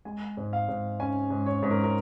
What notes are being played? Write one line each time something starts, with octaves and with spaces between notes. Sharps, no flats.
G#3 G#5
G#2
F5
G#2
C#4 G#5
G#2
C#5
G#2
A#4
A#4